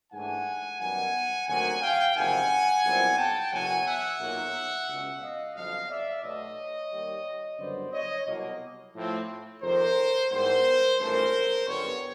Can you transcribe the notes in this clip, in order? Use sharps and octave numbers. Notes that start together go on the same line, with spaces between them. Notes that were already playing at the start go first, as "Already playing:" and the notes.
G#2 E3 A3 D4 F#5 G#5
F#2 D#3 G3 B3 F#5 G#5
D2 C3 D#3 F#3 A#3 F#5 G#5
F5 G5
F#1 F2 C3 D#3 F#5 G#5
B1 A#2 G3 C4 E4
G5 A5
F#1 E2 B2 F#3 F#5 G#5
E5 F#5
B1 A#2 F#3 A#3 D#4
C#2 B2 G#3 C#4
D#5 F5
G1 F2 D3 F#3 D#5 F5
D5 E5
B1 B2 F#3 A3 C#5 D#5
D#2 D#3 G3
F#1 F#2 D3 G3 B3 C5 D5
C#5 D#5
C2 B2 F#3 A#3
A2 F3 A3 C4
F2 C3 D#3 A#4 C5
G#2 E3 G3 B3 A#4 C5
G#1 G2 E3 A3 C#4 A#4 C5
G1 F#2 D3 G3 B3 B4 C#5